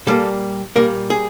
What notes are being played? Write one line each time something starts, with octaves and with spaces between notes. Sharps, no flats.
A#2 G3 A#3 A4
A#2 G3 A#3 A#4
G#4